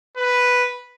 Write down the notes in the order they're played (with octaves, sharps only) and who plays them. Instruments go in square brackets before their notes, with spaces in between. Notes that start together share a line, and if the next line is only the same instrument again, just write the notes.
[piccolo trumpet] B4